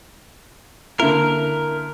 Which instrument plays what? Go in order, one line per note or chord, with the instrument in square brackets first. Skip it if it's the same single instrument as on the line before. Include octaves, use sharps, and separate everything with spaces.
[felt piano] D3 A#3 E4 [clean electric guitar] A#4